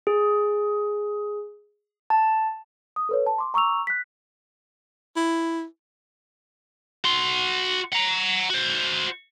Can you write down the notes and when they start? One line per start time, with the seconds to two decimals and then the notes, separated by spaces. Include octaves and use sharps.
0.07 G#4
2.10 A5
2.96 D#6
3.09 A4 B4 C#5
3.26 A5
3.38 C6 D6
3.54 A#5 C#6 D6 E6 F7
3.87 F#6 B6
5.16 E4
7.04 F#4 C6
7.93 F#5 A#5
8.50 F#4 C5